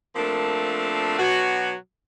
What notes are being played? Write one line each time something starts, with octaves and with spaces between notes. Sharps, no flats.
F3 A3 A#3 C4 D4 A#4
B2 F#3 D4 F#4